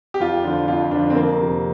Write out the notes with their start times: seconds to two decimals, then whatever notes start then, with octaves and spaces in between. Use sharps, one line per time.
0.14 G4
0.20 F2 F4
0.44 D3 F3 D4
0.68 F2 F4
0.91 D3 F3 D4
1.10 C4
1.15 F2 A#3
1.40 C3 F3